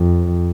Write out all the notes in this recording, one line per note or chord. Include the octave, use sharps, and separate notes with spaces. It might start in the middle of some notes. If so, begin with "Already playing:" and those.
Already playing: F2